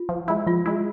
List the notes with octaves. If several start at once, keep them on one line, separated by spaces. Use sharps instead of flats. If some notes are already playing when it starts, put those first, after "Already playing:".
Already playing: F4
F3
G#3 E4
F3 F4
G#3 E4